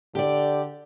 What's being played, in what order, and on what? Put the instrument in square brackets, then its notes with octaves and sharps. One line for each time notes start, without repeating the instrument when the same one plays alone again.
[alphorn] D3 [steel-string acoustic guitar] G4 D5